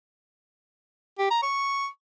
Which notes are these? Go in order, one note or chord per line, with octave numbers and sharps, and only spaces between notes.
G4
A#5
C#6